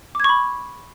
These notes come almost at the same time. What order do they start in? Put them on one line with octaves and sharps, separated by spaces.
D6 G#6 C#6 B5